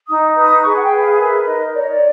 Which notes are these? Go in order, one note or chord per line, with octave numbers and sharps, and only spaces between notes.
D#4 D#6
B4 D#6
G#4 C#6
F#5
G5
B4
F5
F5
A#4 E5
D#4 D#5
C#5 D5
D#5
D5